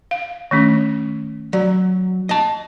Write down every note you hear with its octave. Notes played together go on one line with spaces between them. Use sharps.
F5
D#3 A3 C#4
F#3 D5
D#5 A5